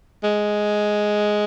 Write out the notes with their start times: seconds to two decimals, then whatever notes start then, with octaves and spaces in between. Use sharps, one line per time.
0.24 G#3